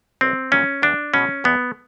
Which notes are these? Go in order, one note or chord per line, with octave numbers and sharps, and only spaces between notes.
B1 C4
A#2 F#3 A#3 C#4
E2 D4
B2 G#3 C#4
E2 B3